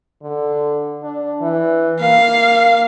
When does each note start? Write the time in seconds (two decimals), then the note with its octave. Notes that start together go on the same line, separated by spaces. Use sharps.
0.23 D3
1.03 D4
1.41 E3
2.01 A#3 F5